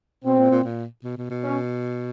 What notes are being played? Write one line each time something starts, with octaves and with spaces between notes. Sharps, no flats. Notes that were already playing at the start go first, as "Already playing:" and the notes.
B2 C4
A#2
A#2
A#2
B2
B2
B2
C#4